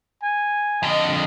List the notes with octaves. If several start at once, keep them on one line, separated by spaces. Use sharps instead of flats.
G#5
F2 D3 D#5